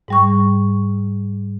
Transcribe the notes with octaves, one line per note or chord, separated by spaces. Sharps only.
G#2 G3 C#6